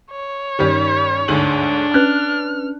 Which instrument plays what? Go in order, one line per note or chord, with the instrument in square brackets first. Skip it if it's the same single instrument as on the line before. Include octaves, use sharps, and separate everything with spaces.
[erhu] C#5
[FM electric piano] G2 D#4 [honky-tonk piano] D#3 G3 C#4
[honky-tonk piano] D2 G#2 F#7 [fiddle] D4
[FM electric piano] C#4 B4 [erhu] F6 [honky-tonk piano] F#6